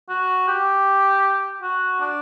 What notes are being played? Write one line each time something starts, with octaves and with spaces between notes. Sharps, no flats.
F#4
G4
F#4
D4